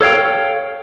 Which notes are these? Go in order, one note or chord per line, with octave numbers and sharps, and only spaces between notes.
A4 C#5 F5 G5